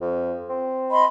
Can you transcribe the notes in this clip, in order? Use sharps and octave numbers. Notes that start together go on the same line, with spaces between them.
F2
C4
D#5 B5 C6